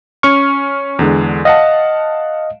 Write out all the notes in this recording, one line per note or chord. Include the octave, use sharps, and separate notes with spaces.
C#4 C#6 F6
E2 D3 G#3
D#5 F5 F#5 A5